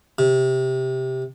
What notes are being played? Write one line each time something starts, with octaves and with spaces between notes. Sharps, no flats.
C3